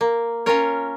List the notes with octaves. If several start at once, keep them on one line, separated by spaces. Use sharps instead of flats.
A#3
C#4 F4 A#4 C#5